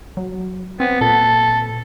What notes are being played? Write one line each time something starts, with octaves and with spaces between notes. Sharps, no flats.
F#3
B3 C4
A#2 A4